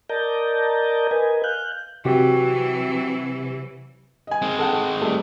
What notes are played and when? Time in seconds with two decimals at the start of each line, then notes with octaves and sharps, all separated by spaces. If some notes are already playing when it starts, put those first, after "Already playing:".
0.10 A#4 D5 D#5 A5 A#5 G6
1.11 A#4 B4 D#5 G#5
1.44 F5 F#6 G6
2.05 C3 E3 F#3 F#4 G4
4.27 D#5 G#5
4.42 G#3 C4
4.59 A4 F#5 G5
5.02 G3 A3